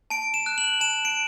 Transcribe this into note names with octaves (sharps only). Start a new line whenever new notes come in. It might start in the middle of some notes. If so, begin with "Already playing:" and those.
A5 D7
E7
F#6
F#7
A5 E7
D7